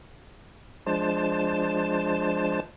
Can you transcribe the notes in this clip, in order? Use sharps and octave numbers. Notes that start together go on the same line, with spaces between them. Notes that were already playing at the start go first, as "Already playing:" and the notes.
F3 G#3 D4 C5 A5